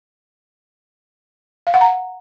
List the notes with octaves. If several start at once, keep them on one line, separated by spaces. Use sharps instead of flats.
F5
F#5
A#5